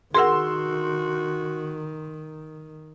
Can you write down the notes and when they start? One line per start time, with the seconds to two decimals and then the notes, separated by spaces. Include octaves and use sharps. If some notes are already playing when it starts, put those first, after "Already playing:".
0.15 D#3 F#4 G#4 A#4 F#5 C6 E6